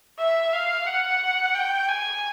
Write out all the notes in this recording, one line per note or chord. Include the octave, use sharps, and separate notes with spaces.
E5
F5
F#5
G5
G#5